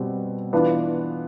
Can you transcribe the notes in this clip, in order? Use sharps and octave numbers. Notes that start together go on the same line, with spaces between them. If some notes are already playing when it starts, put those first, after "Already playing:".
Already playing: B2 G3 C4
E3 B3 D4 F4